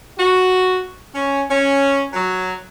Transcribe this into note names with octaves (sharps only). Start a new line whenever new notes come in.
F#4
C#4
C#4
F#3